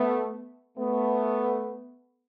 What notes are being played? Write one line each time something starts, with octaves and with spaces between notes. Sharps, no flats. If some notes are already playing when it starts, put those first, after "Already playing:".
Already playing: A3 B3
A3 B3